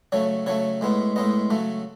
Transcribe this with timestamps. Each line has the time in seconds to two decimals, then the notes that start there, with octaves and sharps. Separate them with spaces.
0.12 C#3 F#3 A3 C#5
0.46 C#3 F#3 A3 C#5
0.81 A2 G#3 B3
1.16 A2 G#3 B3 D#5
1.50 C#3 F#3 A3